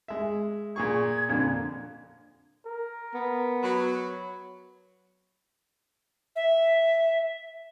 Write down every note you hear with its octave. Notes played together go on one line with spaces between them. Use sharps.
G#3 E5
A#2 G#4 C#6 G#6
F2 A#2 D3
A#4
B3
F#3 B5
E5